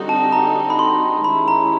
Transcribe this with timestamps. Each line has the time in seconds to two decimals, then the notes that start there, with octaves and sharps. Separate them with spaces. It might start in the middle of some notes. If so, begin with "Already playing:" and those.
Already playing: D3 G3 C4 D#4 F#4
0.09 A5
0.32 A#5
0.70 B5
0.79 C6
1.24 D#3 G#3 C#4 E4 G4 B5
1.48 A#5